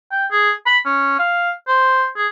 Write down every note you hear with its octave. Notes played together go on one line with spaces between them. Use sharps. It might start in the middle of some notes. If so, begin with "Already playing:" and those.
G5
G#4
B5
C#4
F5
C5
G#4